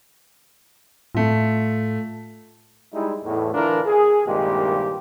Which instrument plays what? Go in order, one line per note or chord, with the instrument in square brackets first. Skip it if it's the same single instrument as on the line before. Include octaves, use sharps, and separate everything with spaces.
[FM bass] A2 [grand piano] A3 F4
[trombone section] G3 G#3 D#4 E4
E2 A2
D3 E3 D4 F4 A#4
G#4
C2 G2 A#2 D#3 G#3 G4